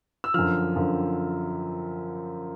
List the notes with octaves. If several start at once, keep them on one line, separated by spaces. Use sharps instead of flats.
E6
F#2 D3 F3 F6
F#2 D3 F3